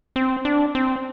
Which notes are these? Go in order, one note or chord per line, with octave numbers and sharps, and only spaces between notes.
C4
D4
C4